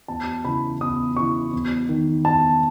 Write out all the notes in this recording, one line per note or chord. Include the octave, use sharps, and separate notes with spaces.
E2 A5
C#3 E3 B5
E2 D#6
C#3 E3 C#6
E2
D#3
E2 A5